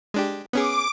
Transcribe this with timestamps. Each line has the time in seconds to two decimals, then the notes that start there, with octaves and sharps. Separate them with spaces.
0.14 G#3 D4 G4
0.53 B3 C#4 G#4 D6